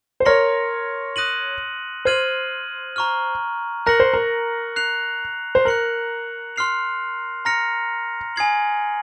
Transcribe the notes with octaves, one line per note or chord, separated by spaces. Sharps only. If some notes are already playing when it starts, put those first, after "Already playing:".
C5
A#4 C#5 C6 F6 A#6 C#7 F7
D#6 F#6 A#6 D#7 F#7
C5 F6 G#6 D#7 F#7
A#5 C#6 F6
A#4 F#6 A#6 C#7 F#7
C5
A#4
F#6 C7 F7
C5
A#4 F#6 C#7 F#7
C6 F6 C7 F7
A#5 F6 A#6 C#7 F7
G#5 D#6 G#6 C7 F#7